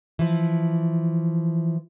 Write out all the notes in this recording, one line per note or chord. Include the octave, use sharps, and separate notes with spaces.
E3 F3